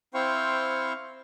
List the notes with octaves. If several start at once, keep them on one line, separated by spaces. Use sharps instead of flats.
C4 E4 C5 F5 G5 C#6